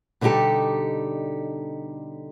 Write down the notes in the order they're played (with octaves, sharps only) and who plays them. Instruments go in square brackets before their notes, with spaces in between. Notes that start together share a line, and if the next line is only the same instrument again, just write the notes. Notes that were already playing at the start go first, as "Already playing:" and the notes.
[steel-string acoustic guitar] B2 D3 G3 D#4 G4 A4